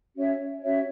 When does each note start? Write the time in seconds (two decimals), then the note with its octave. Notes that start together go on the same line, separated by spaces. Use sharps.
0.15 C#4 F#4 C#5 E5
0.62 C#4 F#4 C#5 E5